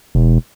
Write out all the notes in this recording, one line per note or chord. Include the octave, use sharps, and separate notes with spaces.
E1